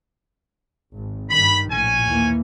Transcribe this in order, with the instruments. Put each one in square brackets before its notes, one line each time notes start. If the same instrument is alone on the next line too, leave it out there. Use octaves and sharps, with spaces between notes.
[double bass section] G#1
[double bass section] G2 D#3 [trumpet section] B5
[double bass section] A#1 A2 [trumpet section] C#4 G#5
[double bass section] D#2 E3 A#3